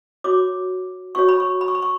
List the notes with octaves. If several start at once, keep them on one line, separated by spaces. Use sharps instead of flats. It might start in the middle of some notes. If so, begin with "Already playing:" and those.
F#4 C#5 D6
F#4 C#5 C#6
B5
C#6
B5
C#6
B5
C#6